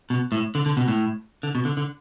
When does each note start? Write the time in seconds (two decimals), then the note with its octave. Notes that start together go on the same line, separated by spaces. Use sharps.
0.10 B2
0.32 A2
0.55 D3
0.66 D3
0.77 B2
0.88 A2
1.43 D3
1.55 B2
1.65 D3
1.77 D3